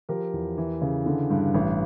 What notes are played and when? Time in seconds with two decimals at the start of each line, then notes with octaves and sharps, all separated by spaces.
0.09 F3 G4 A#4
0.33 E2
0.58 E3
0.82 C#3
1.06 D3
1.30 G2
1.54 A1